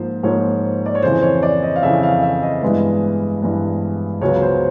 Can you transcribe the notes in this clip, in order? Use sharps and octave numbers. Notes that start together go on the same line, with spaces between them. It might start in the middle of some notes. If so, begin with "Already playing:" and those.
Already playing: G#2 F3 A#3 C5
G#2 F3 A#3 C#5
D5
C#5
F2 C#3 E3 C5
C#5
D5
D#5
F5
F2 C#3 E3 E5
F5
E5
D#5
G2 E3 G#3 B3
G2 E3 G#3 B3
C#2 C#3 F#3 B3 C#5
C5